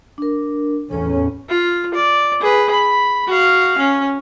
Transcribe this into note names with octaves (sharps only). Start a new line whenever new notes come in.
D4 A#4
E2 A2 C#4 A4 C#5
F4
D5
G#4 B4
B5
F#4 F5
C#4